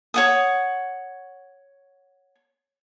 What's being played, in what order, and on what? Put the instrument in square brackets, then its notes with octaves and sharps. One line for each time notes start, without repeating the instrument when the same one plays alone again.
[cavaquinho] C#5 F#5 D#6